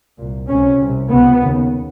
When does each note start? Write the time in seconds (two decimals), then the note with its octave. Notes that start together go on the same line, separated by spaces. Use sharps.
0.18 C2 A#2
0.49 C#2 C3 C#4
0.79 C2 C3
1.10 C#2 C3 B3
1.41 D#2 C#3